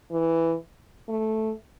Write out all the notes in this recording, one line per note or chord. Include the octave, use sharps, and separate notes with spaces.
E3
A3